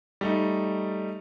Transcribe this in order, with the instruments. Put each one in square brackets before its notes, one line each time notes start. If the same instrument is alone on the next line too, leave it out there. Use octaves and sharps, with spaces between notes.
[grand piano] G3 A3 D#4